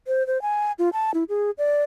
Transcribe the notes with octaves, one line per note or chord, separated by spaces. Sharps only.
C5
C5
G#5
F4
A5
E4
G#4
D5